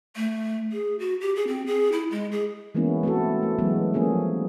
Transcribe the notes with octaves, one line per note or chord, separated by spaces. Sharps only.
A3
G#4
F#4
G4
G#4
C4
G#4
E4
G#3
G#4
E3 G#3 A#3 B3 C#4 E4
A3 C4 E4 F#4 A4
A3
E3 F#3 G#3 A3 B3
F3 A#3 C#4 G#4